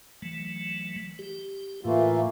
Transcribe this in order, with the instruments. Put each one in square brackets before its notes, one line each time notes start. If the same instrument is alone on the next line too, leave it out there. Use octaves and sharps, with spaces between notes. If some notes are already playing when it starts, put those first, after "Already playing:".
[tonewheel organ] E3 F#3 A3
G4
[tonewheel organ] A2 [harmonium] E3 A3 A#3 [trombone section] F4